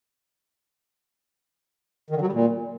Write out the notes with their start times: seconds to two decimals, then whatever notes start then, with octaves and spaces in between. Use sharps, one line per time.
2.10 D#3
2.16 D3
2.21 F#3
2.27 G3
2.33 A#2